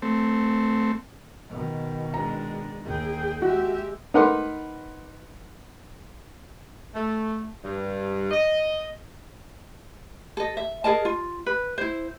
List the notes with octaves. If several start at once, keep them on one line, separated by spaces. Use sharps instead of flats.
A3 C4
B2 D#3
G#3 D4 A#5
D#2 G#4 G5
G#3 F#4 G4 E5
D#4 A#4 B4 F#5 C6 D6
A3
G2
D#5
A4 D#5
E5
G#4 A#4 D#5 A5
F4
B4
E4 C5